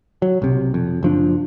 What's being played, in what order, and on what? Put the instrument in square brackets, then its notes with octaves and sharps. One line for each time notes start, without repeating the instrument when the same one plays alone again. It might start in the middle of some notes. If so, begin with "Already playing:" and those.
[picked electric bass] F#3
B1 C3
F2
F#1 F3 D4